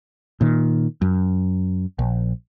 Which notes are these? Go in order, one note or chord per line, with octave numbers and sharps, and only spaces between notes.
A#2 D#3
F#2
A#1